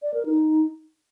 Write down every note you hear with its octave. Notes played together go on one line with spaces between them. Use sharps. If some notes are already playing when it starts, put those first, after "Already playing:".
D5
A#4
D#4